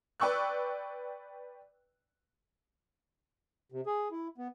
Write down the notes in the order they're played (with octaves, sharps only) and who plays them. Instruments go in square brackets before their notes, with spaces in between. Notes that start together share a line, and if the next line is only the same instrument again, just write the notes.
[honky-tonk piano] B4 D5 G5 C#6 E6 F#6
[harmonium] C3
G#4
E4
B3